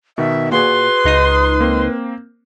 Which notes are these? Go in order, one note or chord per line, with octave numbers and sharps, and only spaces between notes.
B2 D#3 B3 E5
A#2 F#4 G#4 B4 C6
C#2 D#4 D#6
A#3 C4